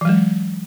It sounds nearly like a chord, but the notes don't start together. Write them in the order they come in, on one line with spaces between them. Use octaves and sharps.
E3 F#3 G#3